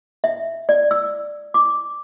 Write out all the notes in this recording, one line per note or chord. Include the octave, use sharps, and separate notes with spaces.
E5
D5
E6
D6